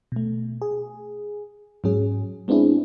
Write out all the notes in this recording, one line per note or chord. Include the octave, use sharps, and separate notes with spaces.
B2 A3
G#4
G#2 F#3 C#4 G#4
G#3 B3 C4 D4 E4 G#4